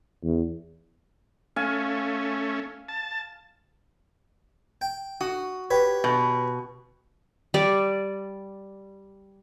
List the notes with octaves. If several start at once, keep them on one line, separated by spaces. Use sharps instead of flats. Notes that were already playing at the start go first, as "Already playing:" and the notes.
E2
A3 C#4 F5 G#5
A5
G5
F#4 D#6
G4 B4 C#5
B2
G3 D5